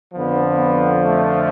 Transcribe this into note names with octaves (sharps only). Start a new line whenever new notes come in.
F2 D3 F3 B3
B3
A3